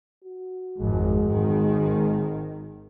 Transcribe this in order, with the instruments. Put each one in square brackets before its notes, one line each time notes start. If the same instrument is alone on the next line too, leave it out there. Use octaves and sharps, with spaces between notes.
[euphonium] F#4
[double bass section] G#1 F2 [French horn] G#3
[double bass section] G#1 D#3